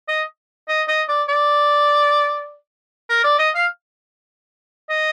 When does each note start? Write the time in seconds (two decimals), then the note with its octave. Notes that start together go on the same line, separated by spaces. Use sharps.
0.08 D#5
0.68 D#5
0.88 D#5
1.08 D5
1.29 D5
3.09 A#4
3.24 D5
3.39 D#5
3.55 F5
4.90 D#5